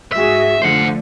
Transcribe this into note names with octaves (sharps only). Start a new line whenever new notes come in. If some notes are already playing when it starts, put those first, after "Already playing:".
G#2 F#4 G#4 E5
D3 F3 A3 C5 F#5